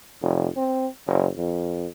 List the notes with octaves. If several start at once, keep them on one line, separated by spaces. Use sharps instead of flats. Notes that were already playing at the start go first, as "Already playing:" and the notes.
F1
C4
F#1
F2